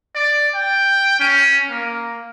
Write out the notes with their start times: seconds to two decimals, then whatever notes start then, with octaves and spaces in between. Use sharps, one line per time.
0.15 D5
0.54 G5
1.20 C#4
1.70 A#3